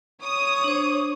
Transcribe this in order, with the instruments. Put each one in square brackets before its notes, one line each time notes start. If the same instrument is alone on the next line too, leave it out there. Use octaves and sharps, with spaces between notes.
[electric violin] C#5 [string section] D#6
[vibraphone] D4 C5